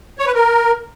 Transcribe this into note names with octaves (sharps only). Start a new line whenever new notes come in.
C#5
B4
A#4